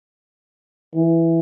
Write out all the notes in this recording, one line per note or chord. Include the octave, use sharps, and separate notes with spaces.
E3